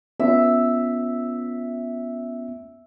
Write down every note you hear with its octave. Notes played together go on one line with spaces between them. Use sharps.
B3 C#4 F4 E5